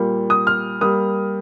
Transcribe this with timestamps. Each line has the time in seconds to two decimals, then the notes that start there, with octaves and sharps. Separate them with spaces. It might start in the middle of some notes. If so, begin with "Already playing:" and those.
Already playing: A#2 G3 A#3
0.30 D#6
0.47 F6
0.81 G3 A#3 D#6